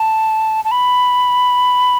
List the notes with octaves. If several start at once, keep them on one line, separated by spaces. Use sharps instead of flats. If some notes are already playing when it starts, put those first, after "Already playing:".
Already playing: A5
A5
B5